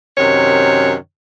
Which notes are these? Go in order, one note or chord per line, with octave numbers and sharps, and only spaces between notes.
F#2 C3 D#3 C#5